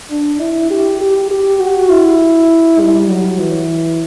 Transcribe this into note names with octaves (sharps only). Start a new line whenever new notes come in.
D4
E4
G4
G4
G4
F#4
E4
G3
F#3
E3